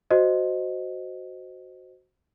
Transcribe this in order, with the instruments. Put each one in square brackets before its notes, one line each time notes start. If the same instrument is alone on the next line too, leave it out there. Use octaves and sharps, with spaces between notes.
[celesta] F#4 C5 D#5